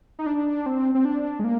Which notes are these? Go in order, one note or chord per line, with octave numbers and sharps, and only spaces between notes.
D#4
D4
C4
C4
D4
G#3
A#3